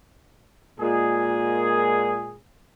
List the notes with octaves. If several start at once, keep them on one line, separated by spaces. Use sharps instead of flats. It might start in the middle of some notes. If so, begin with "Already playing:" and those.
A#2 G#3 G#4